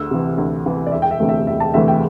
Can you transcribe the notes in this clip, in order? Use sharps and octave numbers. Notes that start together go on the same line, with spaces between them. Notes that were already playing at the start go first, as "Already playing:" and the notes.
Already playing: D2 E6
C3 E3
D2
C3 E3
D5
E1 E5
G5
E5
D2 C3 E3 A3
E5
E1 E5
A5
D2 C3 E3 A3 E5
G5